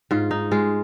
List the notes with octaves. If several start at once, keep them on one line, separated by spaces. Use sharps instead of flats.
G#2 F4
D#4
G#3 F4